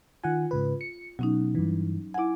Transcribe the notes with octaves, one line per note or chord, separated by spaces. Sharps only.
D#3 F4 F#5 G#5
G#2 C#3 B4
C#7
B2 F#3 C#4 D#4
G2 E3
E4 F#5 G#5 D6